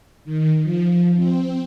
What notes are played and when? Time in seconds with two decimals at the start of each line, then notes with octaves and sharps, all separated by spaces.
0.25 D#3
0.63 F3
1.16 C4